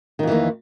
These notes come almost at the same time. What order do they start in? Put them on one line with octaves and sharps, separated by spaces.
D#3 F2 E3 A#3